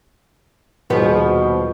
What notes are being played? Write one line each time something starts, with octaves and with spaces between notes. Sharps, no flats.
D#1 B2 F3 B3 G#4 C5